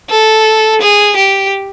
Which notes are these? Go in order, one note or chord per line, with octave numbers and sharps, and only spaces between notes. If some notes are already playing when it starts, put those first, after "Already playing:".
A4
G#4
G4